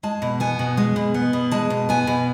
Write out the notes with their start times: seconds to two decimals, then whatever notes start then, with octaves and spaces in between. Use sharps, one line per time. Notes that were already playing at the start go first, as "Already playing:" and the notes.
0.03 G#3 A5
0.22 B2
0.40 B3 G#5
0.59 B2
0.77 G#3
0.96 B2
1.14 B3
1.33 B2
1.51 G#3 A5
1.70 B2
1.89 B3 G#5
2.07 B2